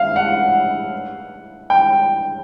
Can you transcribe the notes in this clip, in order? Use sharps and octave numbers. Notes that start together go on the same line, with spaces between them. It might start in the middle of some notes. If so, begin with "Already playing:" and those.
Already playing: E5 F5
F#5
G5